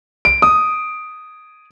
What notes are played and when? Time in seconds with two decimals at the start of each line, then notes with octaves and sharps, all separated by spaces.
0.25 D7
0.42 D#6